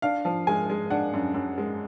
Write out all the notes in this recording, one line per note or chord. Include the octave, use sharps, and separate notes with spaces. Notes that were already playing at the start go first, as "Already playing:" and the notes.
D4 F5
F3
G#3 G#5
G#3
D4 F#5
F#2
F#2
G#3